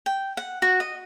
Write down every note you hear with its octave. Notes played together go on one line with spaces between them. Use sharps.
G5
F#5
F#4
D#5